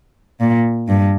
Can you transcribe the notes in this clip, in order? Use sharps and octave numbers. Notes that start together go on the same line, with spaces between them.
A#2
G2